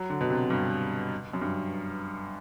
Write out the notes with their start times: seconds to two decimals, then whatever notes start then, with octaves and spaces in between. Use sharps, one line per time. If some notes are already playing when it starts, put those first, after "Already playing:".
Already playing: F#3
0.10 D3
0.21 B2
0.30 C3
0.50 G2
1.33 F#2
1.41 G2